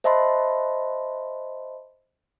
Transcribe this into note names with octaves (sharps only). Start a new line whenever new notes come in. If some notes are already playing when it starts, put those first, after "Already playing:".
C5 D#5 E5 A5 B5 C6